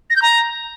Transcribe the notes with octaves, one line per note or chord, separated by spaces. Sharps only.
A#6
G6
A#5